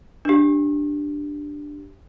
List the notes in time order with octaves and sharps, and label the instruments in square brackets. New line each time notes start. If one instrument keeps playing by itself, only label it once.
[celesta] D4 G4